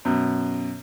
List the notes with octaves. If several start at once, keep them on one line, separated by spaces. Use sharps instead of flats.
F#2 B2